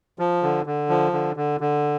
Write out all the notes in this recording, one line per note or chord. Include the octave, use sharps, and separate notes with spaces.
F3
D3
D3
F3
D3
D3
D3